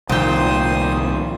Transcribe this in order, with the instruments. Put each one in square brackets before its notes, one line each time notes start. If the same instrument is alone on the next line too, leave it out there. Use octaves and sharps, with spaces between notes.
[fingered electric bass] C2 D#3 F3 [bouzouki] A#2 G5 [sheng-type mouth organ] C5 D#6